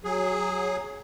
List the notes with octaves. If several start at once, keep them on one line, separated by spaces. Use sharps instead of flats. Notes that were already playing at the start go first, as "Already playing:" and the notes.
F#3 G#4